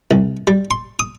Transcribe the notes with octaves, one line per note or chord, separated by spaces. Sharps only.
C2
G3
C6
D#6